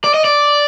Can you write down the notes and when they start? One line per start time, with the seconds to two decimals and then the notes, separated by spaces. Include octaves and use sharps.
0.04 D5
0.14 D#5
0.24 D5